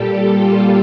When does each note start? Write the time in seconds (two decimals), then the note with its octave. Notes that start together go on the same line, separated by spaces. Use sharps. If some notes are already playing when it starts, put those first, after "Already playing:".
Already playing: A#2 G3 G4 A4
0.34 F4